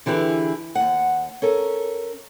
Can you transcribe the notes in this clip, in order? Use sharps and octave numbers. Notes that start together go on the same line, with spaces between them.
D3 E3 E4 G4 G#4
D#2 F#5
C#4 A4 A#4